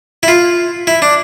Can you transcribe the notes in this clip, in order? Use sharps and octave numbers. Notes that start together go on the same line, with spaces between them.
E4
F4
E4
D4